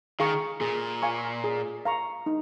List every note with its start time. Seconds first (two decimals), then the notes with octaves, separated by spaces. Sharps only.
0.20 D#3 G#4 F5 A#5 C#6
0.61 A#2 G#4
1.02 F5 G#5 C#6
1.44 G#4
1.85 F5 A#5 C#6
2.26 D#4